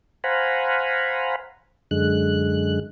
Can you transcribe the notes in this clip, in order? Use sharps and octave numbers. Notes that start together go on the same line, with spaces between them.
C5 F5 F#5 G#5 A#5 B5
F#2 D3 G#3 F#6